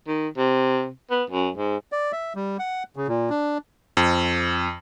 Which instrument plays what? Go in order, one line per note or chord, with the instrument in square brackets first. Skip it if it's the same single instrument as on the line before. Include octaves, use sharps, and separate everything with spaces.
[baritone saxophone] D#3
C3
B3
F#2
G#2
[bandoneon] D5
E5
G3
F#5
C#3
A#2
D4
[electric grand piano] F2